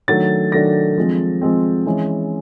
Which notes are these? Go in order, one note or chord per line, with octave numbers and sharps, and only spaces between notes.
D#3 F#3 A3 D4 A6
D#3 F#3 A3 D4 A#6
F3 G#3 C4
F3 G#3 C4
E3 G#3 C#4